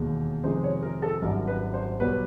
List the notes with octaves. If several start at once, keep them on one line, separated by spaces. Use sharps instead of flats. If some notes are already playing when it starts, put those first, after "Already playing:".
Already playing: E1 D#2 D#3
F2 C3 D#3 G#3 C5
C#5
A#4
A4
G#1 F#2 D#3 G3 A#4
B4
C5
B1 B2 G3 B4